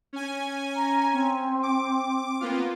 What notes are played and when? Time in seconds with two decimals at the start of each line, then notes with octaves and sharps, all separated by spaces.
0.13 C#4 G#5
0.76 A#5
1.13 C4
1.63 D6
2.41 A#3 B3 F4